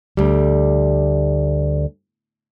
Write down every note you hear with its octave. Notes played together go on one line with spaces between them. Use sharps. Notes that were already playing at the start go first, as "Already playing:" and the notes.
D2 G3